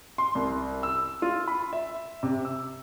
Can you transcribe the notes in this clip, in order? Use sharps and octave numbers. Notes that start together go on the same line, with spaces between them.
C6
C2
E6
F4
B5
E5
C3
E6